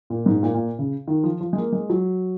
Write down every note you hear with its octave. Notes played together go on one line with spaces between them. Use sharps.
A#2
G#2
A#2
A#2
C#3
D#3
F3
F3
G#3
A#3
G#3
F#3